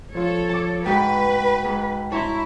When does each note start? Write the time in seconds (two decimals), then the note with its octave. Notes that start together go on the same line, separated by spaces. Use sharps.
0.15 F3 F4 A4 C#5
0.49 A5 D6
0.86 G#2 F#4 B4 G5
1.65 G#2
2.12 E4 C#5 A5 A#5 C6